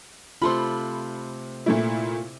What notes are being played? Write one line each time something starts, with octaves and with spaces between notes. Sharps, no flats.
C3 A3 F4 B5 C6
A#2 A3 E4